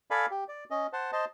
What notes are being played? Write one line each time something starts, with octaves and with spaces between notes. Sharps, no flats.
A4 D5 F5 G#5 B5
G4
D5
C#4 D#5
C5 F#5 A5
C5 D#5 A5